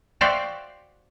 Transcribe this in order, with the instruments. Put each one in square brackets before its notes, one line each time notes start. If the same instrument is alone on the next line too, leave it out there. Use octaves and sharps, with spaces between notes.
[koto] F#4 C5 D5 E5 F5 G5